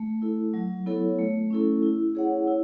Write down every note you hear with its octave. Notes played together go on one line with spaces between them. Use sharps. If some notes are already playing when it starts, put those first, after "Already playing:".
Already playing: A3
E4 A4
F#3
B3 E4 A4 C#5
A3
C#4 E4 A4
E4
G#4 C#5 F#5
E4